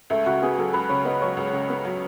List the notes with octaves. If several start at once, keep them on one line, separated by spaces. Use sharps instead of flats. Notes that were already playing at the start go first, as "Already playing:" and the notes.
C#2 A3
C#3 F#4
B3 G#4
F#3 A4
C#2 B4
C#3 C#5
B3 D#5
F#3 C#5
C#2
C#3
B3
F#3